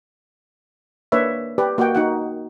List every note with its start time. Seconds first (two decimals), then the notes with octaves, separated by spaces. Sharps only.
1.12 A#3 D4 B4 C#5 D5 E5
1.58 G4 B4 D5 B5
1.78 A#3 F#4 D#5 F#5 G5
1.95 D#4 F#4 F#5